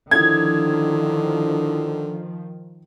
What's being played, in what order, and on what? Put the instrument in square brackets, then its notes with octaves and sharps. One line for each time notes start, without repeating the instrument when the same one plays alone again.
[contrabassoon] D3 [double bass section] D#3 F3 [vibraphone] D4 E4 D#6 [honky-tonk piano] G#6